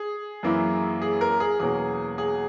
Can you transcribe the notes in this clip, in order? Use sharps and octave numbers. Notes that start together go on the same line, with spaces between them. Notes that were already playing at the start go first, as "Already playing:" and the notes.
Already playing: G#4
F#2 E3 A#3 E4
G#4
A#4
G#4
E2 B2 F#3 A#3 C#4 G#4
G#4